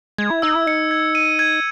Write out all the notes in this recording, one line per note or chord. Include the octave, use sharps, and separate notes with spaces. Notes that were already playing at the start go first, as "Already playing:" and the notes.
G#3 G#6
E4
D#4 E6
E4
D#4 C#7
G#6
D#7
G#6